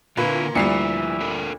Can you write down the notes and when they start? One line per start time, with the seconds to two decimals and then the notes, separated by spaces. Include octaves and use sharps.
0.17 A#2 D3 D4 E4 B4 F5
0.55 D2 A#2 F3 G3 E4 E5 C7 C#7
1.21 D4 A4 A#4